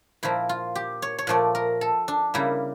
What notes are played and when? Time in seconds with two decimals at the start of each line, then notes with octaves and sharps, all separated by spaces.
0.23 A#2 F3 A#3 E4
0.49 F4
0.76 G4
1.02 C#5
1.18 C#5
1.27 A#2 F3 A3 D5
1.55 A#4
1.81 A4
2.08 D4
2.34 C#3 G3 A#3 E4